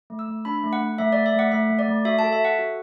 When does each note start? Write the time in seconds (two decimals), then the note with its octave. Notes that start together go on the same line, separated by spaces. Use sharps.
0.10 A3
0.19 E6
0.28 A3
0.45 D4 B5
0.64 A3
0.73 F#5
0.81 A3
0.98 A3 E5
1.12 A3 D5
1.26 E5
1.34 A3
1.39 F#5
1.52 A3 E5
1.70 A3
1.79 D5
1.88 A3
2.05 F#4 E5
2.19 A4 A5
2.32 E5
2.41 A4 F#5
2.59 F#4